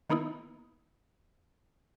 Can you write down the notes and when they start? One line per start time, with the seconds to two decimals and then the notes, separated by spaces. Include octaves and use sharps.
0.10 D#3 A#3 B3 D#4 E4